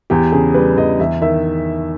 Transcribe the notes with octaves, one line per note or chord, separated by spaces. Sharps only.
E2 G4
C#3 G#4
G3 B4
E2 D#5
E2 E5
D#3 E5